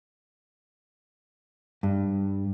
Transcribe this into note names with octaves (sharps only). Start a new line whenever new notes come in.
G2